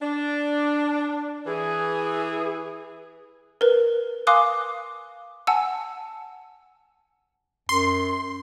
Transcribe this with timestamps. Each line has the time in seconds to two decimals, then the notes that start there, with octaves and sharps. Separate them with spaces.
0.02 D4
1.46 E3 G#4
3.61 A#4 B4
4.27 F5 G#5 C6 D6 D#6 F#6
5.47 F#5 G#5 A5 E6
7.69 F#2 C6